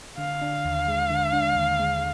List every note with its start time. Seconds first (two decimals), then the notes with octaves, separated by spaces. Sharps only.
0.18 D3 F5
0.42 D4
0.65 D#2
0.88 G#3
1.10 D3
1.33 D4
1.55 D#2
1.79 G#3